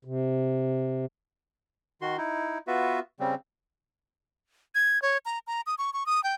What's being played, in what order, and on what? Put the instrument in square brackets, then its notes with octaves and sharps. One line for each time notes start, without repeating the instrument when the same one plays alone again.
[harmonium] C3
[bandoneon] D#3 F#4 C6
D#4 E4
B3 F4 F#4 B4 E5
C#3 G3 C4
[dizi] G#6
C#5
A#5
A#5
D#6
C#6
C#6
D#6
G5